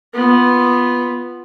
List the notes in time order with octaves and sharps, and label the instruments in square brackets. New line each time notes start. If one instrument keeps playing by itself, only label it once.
[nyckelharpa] B3 F4